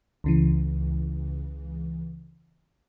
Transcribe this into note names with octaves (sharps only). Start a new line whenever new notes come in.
C#2 C#3 E3